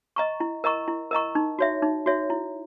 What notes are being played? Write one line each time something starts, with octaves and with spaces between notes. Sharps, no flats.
D#5 A#5 C#6
E4
A#4 D#5 A#5 C#6
E4
A#4 D#5 A#5 C#6
D#4
F#4 C#5 E5
D#4
F#4 C#5 E5
E4